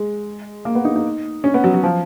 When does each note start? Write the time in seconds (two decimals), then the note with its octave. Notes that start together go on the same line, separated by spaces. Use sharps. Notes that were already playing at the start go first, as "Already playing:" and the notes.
Already playing: G#3
0.65 A#3
0.75 B3
0.85 D#4
0.95 D#4
1.44 C#4
1.54 B3
1.64 F#3
1.74 F#3
1.84 F3